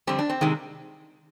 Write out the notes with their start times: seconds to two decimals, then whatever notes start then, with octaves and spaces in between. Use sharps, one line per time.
0.07 F2 D3 G3 C4
0.19 D4
0.30 C4
0.41 C3 D#3 G#3